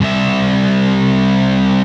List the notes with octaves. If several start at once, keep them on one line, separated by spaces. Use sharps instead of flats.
C2 E5